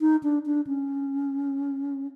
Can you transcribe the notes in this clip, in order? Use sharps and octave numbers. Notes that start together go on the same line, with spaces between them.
D#4
D4
D4
C#4